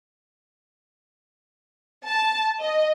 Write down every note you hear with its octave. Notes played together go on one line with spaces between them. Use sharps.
A5
D#5